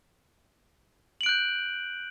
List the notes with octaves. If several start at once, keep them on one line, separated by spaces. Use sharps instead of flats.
F#6 G6 D7 F#7